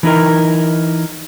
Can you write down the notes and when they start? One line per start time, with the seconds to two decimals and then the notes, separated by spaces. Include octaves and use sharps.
0.03 E3 D#4 E4 A#4